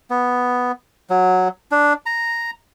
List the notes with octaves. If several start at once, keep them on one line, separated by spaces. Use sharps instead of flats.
B3
F#3
D4
A#5